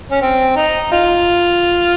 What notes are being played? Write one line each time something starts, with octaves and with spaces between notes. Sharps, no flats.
C#4
C4
D#4
F4